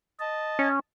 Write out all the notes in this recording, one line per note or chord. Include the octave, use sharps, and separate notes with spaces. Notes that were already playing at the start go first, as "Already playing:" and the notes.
D#5 A5
C#4